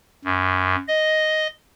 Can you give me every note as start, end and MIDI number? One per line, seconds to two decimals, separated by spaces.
0.25 0.76 42
0.88 1.47 75